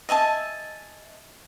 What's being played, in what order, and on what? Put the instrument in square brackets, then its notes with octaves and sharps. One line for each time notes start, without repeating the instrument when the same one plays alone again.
[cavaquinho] D#5 E5 G#5 A5